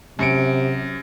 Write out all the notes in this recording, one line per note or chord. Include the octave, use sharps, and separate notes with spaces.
F#2 C3 C#7 D7